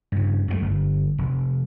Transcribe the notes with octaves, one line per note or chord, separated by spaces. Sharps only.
G2 C#3
F#2 D#3 A3
G1
F1